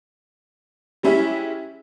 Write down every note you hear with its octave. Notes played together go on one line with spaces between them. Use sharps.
G3 G#3 C#4 E4 G4 E5